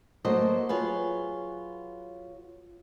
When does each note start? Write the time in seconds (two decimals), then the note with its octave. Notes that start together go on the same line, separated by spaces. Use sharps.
0.25 F#3 A3 A#3 C5 D#5
0.69 F#3 F4 G#4 B4